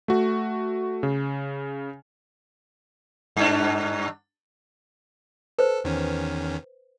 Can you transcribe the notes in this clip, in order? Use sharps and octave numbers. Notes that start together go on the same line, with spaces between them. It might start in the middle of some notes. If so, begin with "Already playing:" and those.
A3 F#4
C#3
G2 D4
A4 B4 C5
E2 D#3 C#4